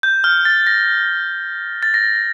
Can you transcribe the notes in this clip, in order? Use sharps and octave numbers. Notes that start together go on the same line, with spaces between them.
G6
F6
A6
A#6
A6
A#6